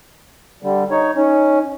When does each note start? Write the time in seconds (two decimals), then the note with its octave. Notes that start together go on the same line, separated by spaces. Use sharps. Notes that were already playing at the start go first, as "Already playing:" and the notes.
0.63 D3 G3
0.91 D#4 C#5
1.16 C#4 D#4